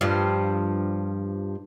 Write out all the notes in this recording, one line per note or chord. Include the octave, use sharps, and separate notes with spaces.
G2 F3